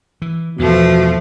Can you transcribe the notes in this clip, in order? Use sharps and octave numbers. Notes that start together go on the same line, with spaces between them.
E3
E2 G2 B2 F3 A3